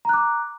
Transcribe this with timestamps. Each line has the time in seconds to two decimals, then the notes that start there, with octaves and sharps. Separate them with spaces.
0.05 A#5
0.09 F#6
0.13 D6